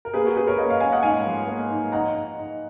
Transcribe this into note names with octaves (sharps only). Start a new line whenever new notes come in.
A#4
A#3 G#4 B4
F#4 A#4
C#4 G#4 B4
A#4 C#5
A#3 B4 D#5
C#5 F5
C#4 F5 G#5
D#5 F#5
G#2 F5 G#5
F3
A#3
G#2
D#4 F#5 A#5
D#4
D#4